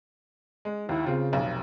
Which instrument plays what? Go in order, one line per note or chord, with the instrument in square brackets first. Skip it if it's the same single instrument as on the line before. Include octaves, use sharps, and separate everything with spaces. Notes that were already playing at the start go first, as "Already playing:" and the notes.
[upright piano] G#3
[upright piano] D#2 [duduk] E4
[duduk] C#3 [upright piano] C4 F4
[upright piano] F1 B1